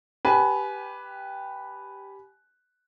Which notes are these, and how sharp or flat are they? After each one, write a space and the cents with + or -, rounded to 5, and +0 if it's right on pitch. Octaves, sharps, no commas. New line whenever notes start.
G4 +0 B4 +0 G#5 +30